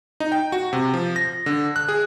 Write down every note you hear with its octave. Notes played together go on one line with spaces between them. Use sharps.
D#4
G5
F#4
C3
F3
A#6
D3
F#6
G#4